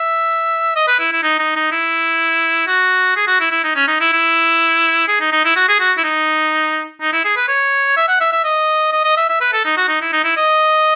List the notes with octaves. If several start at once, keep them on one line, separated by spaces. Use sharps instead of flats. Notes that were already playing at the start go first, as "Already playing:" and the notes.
Already playing: E5
D#5
B4
E4
E4
D#4
D#4
D#4
E4
F#4
G#4
F#4
E4
E4
D#4
C#4
D#4
E4
E4
G#4
D#4
D#4
E4
F#4
G#4
F#4
E4
D#4
D#4
E4
G#4
B4
C#5
E5
F#5
E5
E5
D#5
D#5
D#5
E5
E5
B4
A4
D#4
F#4
D#4
E4
D#4
E4
D#5